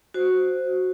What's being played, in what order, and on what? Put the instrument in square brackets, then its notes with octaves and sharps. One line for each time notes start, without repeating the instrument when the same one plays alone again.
[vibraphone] F#4 C5